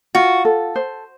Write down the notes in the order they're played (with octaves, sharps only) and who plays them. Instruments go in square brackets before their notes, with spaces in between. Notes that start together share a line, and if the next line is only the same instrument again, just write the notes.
[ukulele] F4 [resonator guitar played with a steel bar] F#4
[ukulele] A4
C5